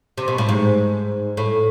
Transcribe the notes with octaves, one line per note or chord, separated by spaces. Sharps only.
C3
B2
A2
G#2
A2